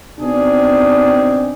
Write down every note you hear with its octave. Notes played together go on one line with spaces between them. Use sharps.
B2 C4 D4 D#4 G#4